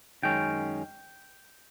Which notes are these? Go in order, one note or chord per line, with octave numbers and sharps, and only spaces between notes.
F#2 D#3 G#3 C#4 G5